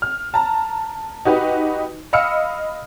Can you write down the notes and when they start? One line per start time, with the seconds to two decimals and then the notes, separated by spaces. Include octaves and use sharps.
0.02 F6
0.34 A5 A#5
1.25 D#4 F#4 G4 B4 D#5
2.13 D#5 F5 B5 E6 F6 C#7